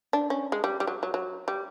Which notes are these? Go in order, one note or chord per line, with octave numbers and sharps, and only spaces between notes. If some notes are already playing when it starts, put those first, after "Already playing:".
D4
C#4
G#3
G3
G3
F#3
F#3
F#3
G3